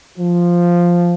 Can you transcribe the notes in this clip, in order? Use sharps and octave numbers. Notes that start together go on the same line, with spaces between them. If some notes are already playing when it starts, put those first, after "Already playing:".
F3